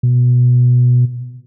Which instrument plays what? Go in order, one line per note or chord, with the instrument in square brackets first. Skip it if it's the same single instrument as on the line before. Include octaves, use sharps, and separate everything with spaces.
[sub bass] B2